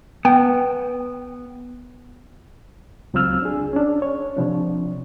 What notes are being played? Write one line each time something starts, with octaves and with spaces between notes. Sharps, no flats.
B3 G5
C#2 F#3 C4 F4 E6 F6
D4 G#4
C#4 D4
C#5
C3 F3 D4